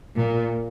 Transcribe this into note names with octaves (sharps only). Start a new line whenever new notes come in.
A#2